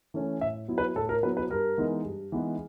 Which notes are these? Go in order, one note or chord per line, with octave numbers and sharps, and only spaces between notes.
E3 A3 C#4
A2 E5
F#3 B3 E4
B4
A2 A4
A#4
F#3 B3 E4 B4
B4
G2 A#4
E3 G#3 B3 D#4
G2
E3 G#3 B3 D#4